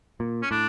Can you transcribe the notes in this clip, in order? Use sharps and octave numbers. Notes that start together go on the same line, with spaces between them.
A#2
C#4
A2 D4